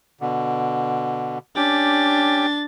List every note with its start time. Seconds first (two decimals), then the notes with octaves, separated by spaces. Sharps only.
0.21 B2 D3
1.56 C#4 D4 G4 G5 A6